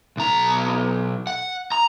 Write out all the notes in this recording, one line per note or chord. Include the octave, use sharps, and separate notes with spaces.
B1 A#5
F#5
A#5